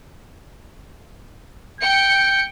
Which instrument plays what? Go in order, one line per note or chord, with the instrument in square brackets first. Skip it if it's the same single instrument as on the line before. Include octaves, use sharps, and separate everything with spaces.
[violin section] G5 C#7 [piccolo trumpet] G6